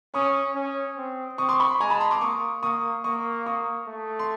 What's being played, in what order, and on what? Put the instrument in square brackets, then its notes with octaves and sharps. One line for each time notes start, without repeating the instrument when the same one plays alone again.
[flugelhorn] C#4 [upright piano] C#6 D#6
[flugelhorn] C#4
C4
[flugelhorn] C4 [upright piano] C#6 D#6
[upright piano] C6 D6
B5 C#6
[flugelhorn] G#3 [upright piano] G#5 A#5
[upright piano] A5 B5
A#5 C6
C6 D6
[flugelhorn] A#3 [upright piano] C#6 D#6
[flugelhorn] A#3 [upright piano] C#6 D#6
[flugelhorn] A#3 [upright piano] C#6 D#6
[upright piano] C#6 D#6
[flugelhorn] A3
[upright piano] C6